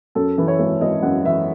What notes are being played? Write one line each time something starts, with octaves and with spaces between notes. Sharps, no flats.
F#2 A4
E3
C#5
G#1
G#1 D#5
F#2 F#5
E3 E5